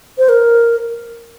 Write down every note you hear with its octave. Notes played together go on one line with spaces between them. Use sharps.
C5
A#4